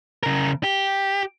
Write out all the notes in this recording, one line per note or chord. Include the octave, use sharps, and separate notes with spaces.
C#3 A#4
G4